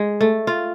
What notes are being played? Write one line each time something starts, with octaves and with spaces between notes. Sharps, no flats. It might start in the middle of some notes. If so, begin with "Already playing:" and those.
Already playing: G#3
A3
F4